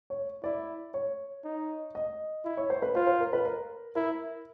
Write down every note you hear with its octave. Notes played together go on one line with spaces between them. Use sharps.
C#5
E4 D5
C#5
D#4
D#5
E4
C#5
C5
B4
F4 C5
C5
A#4
B4
A#4
E4 A#4